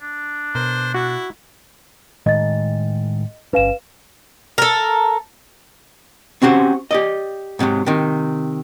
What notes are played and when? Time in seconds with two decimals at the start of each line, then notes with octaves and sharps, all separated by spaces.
0.02 D4
0.55 B2 A#4 C5
0.94 E4 F#4
2.26 A2 D#3 G#3 D#5 A6
3.53 G1 C#4 B4 F5 E7
4.58 A4 A#4
6.42 C4 C#4 F#4 G4 C5
6.91 G4 D5 D#5
7.59 G#2 C3 D#3 F#3
7.86 C3 D#3